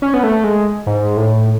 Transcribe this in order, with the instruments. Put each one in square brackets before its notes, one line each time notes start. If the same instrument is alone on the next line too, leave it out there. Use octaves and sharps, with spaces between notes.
[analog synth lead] C#4
B3
A3
G#3
G#2
A2